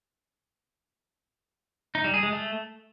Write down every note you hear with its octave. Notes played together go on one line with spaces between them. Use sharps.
D#4
G3
G#4
G#3
A3